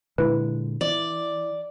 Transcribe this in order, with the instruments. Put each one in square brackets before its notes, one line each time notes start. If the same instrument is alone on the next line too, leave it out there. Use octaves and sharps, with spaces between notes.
[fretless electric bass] A#2 D3 G#3 [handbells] E4 B4
[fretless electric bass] E3 [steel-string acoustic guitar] D5